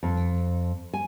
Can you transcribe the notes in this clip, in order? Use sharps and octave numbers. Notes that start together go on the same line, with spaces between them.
F2
G#5